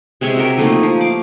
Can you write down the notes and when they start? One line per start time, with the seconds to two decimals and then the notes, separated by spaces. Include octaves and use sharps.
0.21 C3 G#3 C#5 E5
0.36 F#4 G4 A#4
0.58 F3 A3 A#3 D#4
0.83 F3
1.01 F5 D6